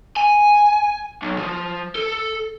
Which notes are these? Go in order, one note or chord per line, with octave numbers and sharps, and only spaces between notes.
G#5
B1
F3
A4